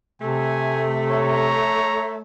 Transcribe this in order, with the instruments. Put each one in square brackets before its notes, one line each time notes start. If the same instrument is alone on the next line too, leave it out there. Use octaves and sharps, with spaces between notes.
[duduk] C3 [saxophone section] A3 [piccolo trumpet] G#5
[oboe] C#5 [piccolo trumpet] A#5